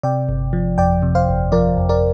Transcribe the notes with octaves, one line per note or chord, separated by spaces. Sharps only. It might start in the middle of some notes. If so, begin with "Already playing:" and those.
C3 D5 G5
G1
F3
F2 D5 G5
C3
C5 F5
G1
F3 A#4 D5
F2
A#4 D5